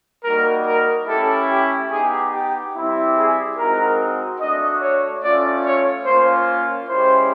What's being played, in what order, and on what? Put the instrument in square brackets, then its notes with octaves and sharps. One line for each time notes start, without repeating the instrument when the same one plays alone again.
[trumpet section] G3 A#3 D#4 F#4 A#4
A#4
A3 C#4 E4 G4 A4
G4
B3 D#4 G4 G#4
G4
G3 C4 E4 G4
G#4
G#3 C4 D#4 F#4 A#4
A3 D4 F#4 D#5
C#5
A3 C#4 F4 D5
C#5
A#3 C#4 F4 C5
G#3 C#4 E4 G4 C5